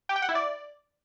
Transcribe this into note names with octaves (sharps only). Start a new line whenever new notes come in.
G4
G5
F#5
E4
D5